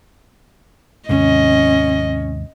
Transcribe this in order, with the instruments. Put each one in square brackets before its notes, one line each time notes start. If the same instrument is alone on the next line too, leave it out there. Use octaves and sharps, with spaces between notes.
[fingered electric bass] D#2 G#2 C3 [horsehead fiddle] C#4 [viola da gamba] D#5